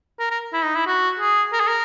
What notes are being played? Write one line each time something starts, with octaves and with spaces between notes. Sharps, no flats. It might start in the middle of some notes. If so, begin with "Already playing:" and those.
A#4
A#4
E4
D#4
E4
F#4
G#4
A#4
G#4
A#4